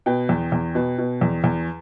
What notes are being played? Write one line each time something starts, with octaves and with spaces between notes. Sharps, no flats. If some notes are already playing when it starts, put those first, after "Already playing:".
B2 G5
E2
E2
B2
B2
E2
E2